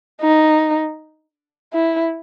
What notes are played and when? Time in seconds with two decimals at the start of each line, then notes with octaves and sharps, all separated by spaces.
0.22 D#4
1.74 E4